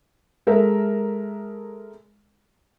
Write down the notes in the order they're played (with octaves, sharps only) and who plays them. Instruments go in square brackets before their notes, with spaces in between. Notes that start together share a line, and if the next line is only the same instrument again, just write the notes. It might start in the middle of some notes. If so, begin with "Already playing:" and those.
[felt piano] G#3 A4 A#4 E5